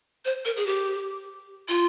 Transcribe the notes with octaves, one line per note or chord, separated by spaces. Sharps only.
C5
A#4
G#4
G4
F4